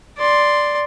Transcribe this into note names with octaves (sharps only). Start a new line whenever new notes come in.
D5 C6